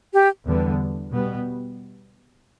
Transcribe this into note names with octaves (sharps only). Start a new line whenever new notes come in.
G4
E2 D3 G3 B3
B2 G3 B3